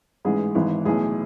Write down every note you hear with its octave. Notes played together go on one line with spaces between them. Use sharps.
A1 G#2 E3 G#4
G#1 G#2 E3
B1 A2 E3 G#4